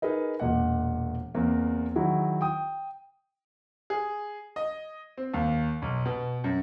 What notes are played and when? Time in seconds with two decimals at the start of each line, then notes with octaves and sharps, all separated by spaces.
0.02 D#4 G#4 A#4 B4 D#5
0.40 E1 A#2 D#5 F#5
1.34 E2 A#3 C4
1.95 D#3 F#3 E4 F#4 G#4
2.41 G5 D#6
3.90 G#4
4.56 D#5
5.17 C4
5.34 D#2
5.82 B1
6.05 B2
6.44 F#2